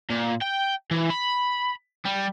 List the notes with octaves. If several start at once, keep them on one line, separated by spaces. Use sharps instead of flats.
A#2
G5
E3
B5
G3